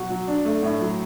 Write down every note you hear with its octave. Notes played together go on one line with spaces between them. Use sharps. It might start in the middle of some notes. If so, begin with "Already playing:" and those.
Already playing: B2 F#3 F#4
F#3
D4
A3
A2
F#3